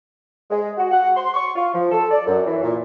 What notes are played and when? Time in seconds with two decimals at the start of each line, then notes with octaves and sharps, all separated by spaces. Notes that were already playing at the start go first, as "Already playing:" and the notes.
0.50 G#3
0.78 F#4
0.92 F#5
1.16 C6
1.34 C#6
1.55 F4
1.74 F3
1.91 A4
2.11 D5
2.26 F#2
2.46 E3
2.63 A#2